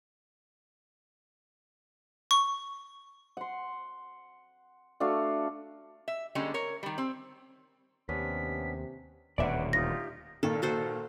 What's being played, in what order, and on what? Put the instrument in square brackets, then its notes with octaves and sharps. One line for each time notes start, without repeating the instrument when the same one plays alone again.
[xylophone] C#6
[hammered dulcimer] F#5 C6
A3 D4 F#4 F5
[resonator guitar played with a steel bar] E5
D3 G3 G#3 A#3 C#4
A#4 C#5
D#3 G3
C4
[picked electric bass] D#2 [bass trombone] C3 [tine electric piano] B3 C#4 D4 [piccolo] B6
[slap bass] D#1 D2 B2 [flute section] B4 F#5 [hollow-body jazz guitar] D5 E5
[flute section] D#4 F4 G4 [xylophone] A#6
[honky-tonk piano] A#2 D#3 [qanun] A4
[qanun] F#4 A4 C5